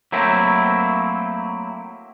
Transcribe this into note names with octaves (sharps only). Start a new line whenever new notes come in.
F#3 A3 A#3 C4 E4